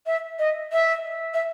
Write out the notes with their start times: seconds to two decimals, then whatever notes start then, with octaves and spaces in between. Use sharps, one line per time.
0.06 E5
0.39 D#5
0.73 E5
1.34 E5